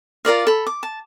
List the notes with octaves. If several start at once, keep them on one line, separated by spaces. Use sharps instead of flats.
F4 A#4 D5 F5
A4 B5
D6
A5